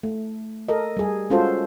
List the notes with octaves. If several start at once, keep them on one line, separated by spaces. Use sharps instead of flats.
A3
A4 A#4 D#5
G3 G#4
G#3 C#4 F4 F#4 A4 C5